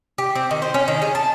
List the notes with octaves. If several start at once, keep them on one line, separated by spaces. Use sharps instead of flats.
G4
C4
D#3
C5
C#4
D#3
G#4
A5